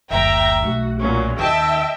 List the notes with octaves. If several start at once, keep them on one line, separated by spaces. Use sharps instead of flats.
F#1 D2 E5 G5 A#5
B1 A3 F#4
A#2 F#3 C#4
D#2 D#3 D#5 E5 G5 A5